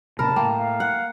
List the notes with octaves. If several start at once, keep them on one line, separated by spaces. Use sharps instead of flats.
A#2 C#3 A#4 A5 B5
A2 A#3 G5
F5
F#5